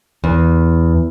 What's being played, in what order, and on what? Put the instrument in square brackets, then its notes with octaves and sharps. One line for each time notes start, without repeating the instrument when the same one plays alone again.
[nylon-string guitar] E2